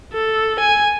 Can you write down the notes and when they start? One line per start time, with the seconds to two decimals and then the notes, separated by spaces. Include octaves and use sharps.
0.13 A4
0.59 G#5